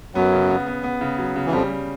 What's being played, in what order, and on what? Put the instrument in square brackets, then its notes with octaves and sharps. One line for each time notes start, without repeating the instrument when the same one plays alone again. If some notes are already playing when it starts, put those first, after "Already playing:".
[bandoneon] F#2 F#3 [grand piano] B3
[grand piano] C#3
B3
B3
B3
C#3
F#3
C#3
[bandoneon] E3
[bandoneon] F2 F3 [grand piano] G3
[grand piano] G3